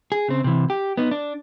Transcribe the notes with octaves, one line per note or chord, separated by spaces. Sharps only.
G#4
C#3 C4
C3 E3
G4
B3 D#4
D4